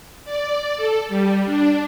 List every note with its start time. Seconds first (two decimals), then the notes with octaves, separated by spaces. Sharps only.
0.25 D5
0.77 A4
1.09 G3
1.45 D4